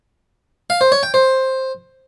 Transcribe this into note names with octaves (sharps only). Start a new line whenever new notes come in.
F5
C5
C#5
G5
C5